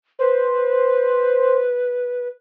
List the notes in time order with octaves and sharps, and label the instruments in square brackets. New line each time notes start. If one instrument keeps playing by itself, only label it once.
[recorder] B4 [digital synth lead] C5